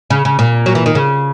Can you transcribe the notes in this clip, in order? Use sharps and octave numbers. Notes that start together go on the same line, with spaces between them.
C#3
C#3
A#2
F#3
E3
D#3
C#3